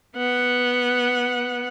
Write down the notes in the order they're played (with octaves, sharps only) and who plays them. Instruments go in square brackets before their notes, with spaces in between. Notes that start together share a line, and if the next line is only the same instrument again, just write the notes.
[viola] B3 F#5